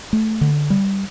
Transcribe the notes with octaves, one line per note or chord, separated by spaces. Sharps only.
A3
D3
G3